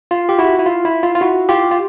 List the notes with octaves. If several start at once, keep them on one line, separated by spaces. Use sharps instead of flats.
F4
G4
E4 F#4
E4
F4
E4
F4
F4
E4 F#4
F4 G4
F4